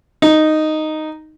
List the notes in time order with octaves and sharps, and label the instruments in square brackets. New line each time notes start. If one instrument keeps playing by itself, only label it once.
[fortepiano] D#4